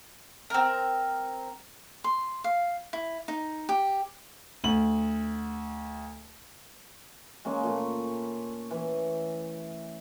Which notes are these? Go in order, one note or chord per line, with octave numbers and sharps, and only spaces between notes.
C4 A#4
C6
F5
E4
D#4
G4
D2 F#7
G#3 A#3 C#4
A#2 A3
E3